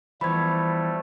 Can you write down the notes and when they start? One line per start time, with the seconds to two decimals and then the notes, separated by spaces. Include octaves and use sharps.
0.21 E3 F3 G3 A3 B3 B5 G#6